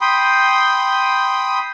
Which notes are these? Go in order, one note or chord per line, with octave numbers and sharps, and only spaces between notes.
G5 B5 C6 D#6